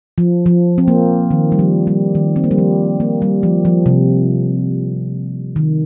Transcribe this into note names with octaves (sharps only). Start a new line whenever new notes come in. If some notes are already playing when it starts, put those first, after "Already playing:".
F3
F3
C4
A#3
D#3
G3
F3
G3
D#3
C4
A#3
G3
F3
A#3
G3
F3
F3
C3
D#3